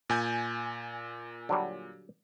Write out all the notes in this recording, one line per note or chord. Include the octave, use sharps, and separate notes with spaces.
A#2 G#5 G6
D3 F#3 G3